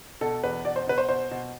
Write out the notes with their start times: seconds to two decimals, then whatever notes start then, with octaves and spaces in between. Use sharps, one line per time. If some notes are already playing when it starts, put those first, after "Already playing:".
0.21 B2 A4
0.43 E2 B4
0.65 B2 D5
0.76 C5
0.87 B2 B4
0.98 C5
1.09 B2 C5
1.31 B2